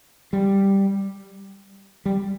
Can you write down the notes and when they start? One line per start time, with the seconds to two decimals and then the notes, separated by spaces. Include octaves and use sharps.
0.33 G3
2.06 G3